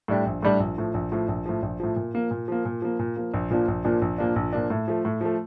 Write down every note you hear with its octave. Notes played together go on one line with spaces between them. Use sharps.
A2 G3 D4 G4
A#1
A2 G3 D4 G4
A#1
A2 F3
A#1
A2 F3
A#1
A2 F3
A#1
A2 F3
A#2
F3 A#3
A#2
F3 A#3
A#2
F3 A#3
A#2
F3 A#3
A#1
A#2 F3 A#3 D4
A#1
A#2 F3 A#3 D4
A#1
A#2 F3 A#3 D4
A#1
A#2 F3 A#3 D4
A2
F3 A3
A2
F3 A3